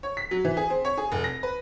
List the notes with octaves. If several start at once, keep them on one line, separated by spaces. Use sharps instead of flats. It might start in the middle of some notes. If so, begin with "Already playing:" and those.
C#5
B6
F#3
E3
G#4
C4
C#5
G#4
F1
A#6
B4